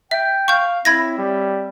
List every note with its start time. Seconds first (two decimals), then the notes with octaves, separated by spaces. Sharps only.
0.11 E5 G5
0.48 F5 C#6 G6
0.85 C4 E4 C#5 E5 B5 G#6 A#6
1.18 G3